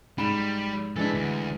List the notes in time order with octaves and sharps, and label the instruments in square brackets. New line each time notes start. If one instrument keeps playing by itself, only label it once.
[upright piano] G#2 B5 E7 [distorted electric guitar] G3
[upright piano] E3 G#3 D4 [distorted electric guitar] E4 A4
[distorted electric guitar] D2